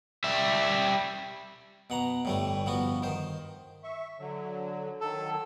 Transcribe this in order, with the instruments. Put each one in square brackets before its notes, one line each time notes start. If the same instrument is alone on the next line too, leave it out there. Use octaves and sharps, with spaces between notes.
[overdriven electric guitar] G3 E5
[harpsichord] B2 F#5 A#5
[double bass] G1 [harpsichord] A2 G3 A3
[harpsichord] F3 B3 F#4
D#3 C5
[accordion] E5 C#6
D3 F#3
[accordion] D#3 F#3 [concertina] A4